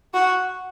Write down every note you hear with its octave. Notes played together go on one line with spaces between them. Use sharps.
F#4